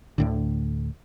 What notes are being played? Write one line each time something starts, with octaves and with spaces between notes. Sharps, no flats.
D2 A2 D3